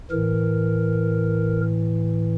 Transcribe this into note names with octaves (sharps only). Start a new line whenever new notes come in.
A2 E3 A#4